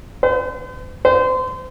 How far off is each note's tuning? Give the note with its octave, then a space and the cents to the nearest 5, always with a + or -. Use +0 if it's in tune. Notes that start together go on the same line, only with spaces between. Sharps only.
C5 -45
C5 -30